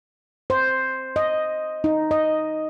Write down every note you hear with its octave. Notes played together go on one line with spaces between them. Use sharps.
C5
D#5
D#4
D#5